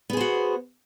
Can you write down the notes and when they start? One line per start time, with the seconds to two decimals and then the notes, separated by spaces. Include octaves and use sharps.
0.10 B3
0.13 G#4
0.17 C5
0.21 F#4